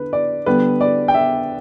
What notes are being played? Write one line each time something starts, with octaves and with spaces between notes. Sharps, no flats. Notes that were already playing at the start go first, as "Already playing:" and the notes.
Already playing: D3 B4
D5
D3 G3 B3 B4
D5
G5
E5